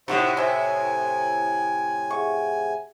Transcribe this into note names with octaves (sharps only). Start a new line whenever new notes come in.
A2 C3 D#4 F#4 C5 E5
C5 E5 G#5
G#4 E5 F#5 C#6